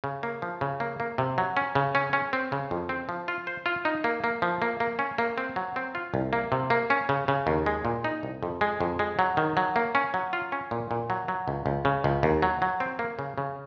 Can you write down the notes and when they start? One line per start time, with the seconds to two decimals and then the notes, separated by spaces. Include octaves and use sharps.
0.04 C#3
0.23 A#3
0.42 F3
0.61 C#3
0.80 A#3
1.00 A#3
1.18 C3
1.38 F#3
1.57 C#4
1.75 C#3
1.95 C#4
2.13 C#4
2.33 C4
2.52 C#3
2.71 F2
2.89 C4
3.09 F3
3.28 F4
3.47 C5
3.66 F4
3.85 D#4
4.04 A#3
4.24 A#3
4.42 F3
4.62 A#3
4.80 A#3
4.99 C#4
5.18 A#3
5.38 C4
5.56 F#3
5.76 C4
5.95 F4
6.14 C2
6.33 A#3
6.52 C3
6.70 A#3
6.90 C#4
7.09 C#3
7.28 C#3
7.47 D#2
7.66 G#3
7.85 A#2
8.04 D#4
8.23 C2
8.43 F2
8.61 G#3
8.81 F2
8.99 G#3
9.19 F#3
9.37 D#3
9.57 F#3
9.76 A#3
9.95 C#4
10.14 F#3
10.33 F4
10.52 C#4
10.71 A#2
10.91 A#2
11.10 F#3
11.28 F#3
11.48 C#2
11.66 C#2
11.85 C#3
12.04 C#2
12.23 D#2
12.42 F#3
12.62 F#3
12.80 C4
12.99 A#3
13.19 C#3
13.38 C#3